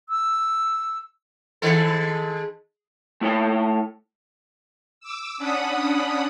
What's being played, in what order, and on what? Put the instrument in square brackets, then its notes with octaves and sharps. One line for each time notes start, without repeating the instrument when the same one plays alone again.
[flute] E6
[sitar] D#3 G#3 A4
[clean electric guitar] A3 E4 C#5 G5
[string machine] D6 E6
C#4 D4 F#5 B5 D#6